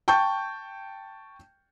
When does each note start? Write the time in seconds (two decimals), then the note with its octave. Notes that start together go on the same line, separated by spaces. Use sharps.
0.08 G5 A5 C#6 G6